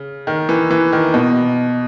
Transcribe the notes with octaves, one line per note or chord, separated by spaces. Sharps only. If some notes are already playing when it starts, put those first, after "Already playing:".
Already playing: C#3
D#3
E3
E3
D#3
B2